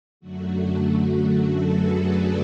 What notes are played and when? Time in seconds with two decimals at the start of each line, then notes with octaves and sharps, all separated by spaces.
0.20 F#2 D3 F#3 A3 F#4
0.50 F#4
0.80 F#4
1.39 F#4 A4
1.68 G#4 B4
1.97 B4 D5